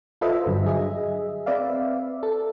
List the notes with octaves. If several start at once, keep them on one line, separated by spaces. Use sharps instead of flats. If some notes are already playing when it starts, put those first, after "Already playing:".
F4 A4 B4 C5 D#5 E5
G2 D3 F#3
G#4 D#5 E5
C4 B4 D5 E5 F5
A4